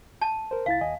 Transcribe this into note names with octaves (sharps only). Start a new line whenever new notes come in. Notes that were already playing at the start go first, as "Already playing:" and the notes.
A5
A#4 C5
C#2 E4 F5 A6
D#2 D#5 G#5